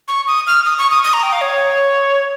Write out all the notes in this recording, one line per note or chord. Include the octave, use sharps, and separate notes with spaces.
C#6
D#6
F6
D#6
C#6
D#6
D#6
A#5
G5
F5
C#5